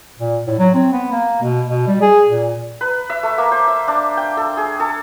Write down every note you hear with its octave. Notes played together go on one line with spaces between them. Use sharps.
A#2
A2
F#3
C4
B3
A#3
B2
B2
G3
G#4
A#2
B4
E5
A3
A#3
C5
E5
D4
G5
A4
G#4
A4